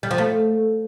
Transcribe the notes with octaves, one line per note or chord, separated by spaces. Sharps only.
G3
F3
A3